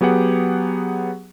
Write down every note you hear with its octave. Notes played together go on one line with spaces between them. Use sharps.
F#3 B3 G4 G#4 F#5